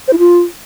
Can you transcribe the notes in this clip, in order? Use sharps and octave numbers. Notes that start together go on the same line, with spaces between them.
C5
E4
F4